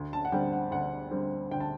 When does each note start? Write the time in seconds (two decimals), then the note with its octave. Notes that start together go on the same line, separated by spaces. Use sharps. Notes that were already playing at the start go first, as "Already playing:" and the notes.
Already playing: D2
0.13 A5
0.25 F#5
0.32 D3 G3 C4 G5
0.53 F#5
0.71 D2 F#5
1.11 D3 G3 C4
1.51 D2 G5
1.60 A5